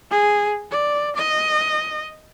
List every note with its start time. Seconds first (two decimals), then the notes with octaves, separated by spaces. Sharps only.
0.11 G#4
0.71 D5
1.16 D#5